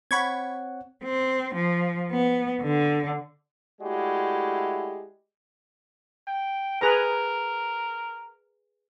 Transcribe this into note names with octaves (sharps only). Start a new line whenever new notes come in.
C4 C#5 F#5 B5 C#6 G#6
C4
F3
B3
D3
G#3 A3 E4 F#4 G4 D5
G5
G#4 A#4 B4 A#5